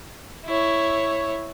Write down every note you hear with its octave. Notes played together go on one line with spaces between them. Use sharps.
E4 C#5